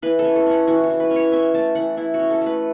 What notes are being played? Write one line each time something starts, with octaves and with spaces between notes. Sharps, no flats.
E3 B4
A4
C#4
A4
C#4 F#5
E3 F#4
F#4
E3
B4
C#4
C#5
C#4 E5
A3 A5
E3 F#5
E3 E4
F#4
C#4
A4
A3 B4